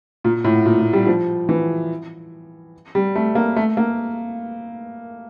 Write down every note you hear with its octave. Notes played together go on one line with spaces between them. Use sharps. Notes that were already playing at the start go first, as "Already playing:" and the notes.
A#2
A2
A#2
A#2
G3
F3
E3
G3
A3
A#3
A3
A#3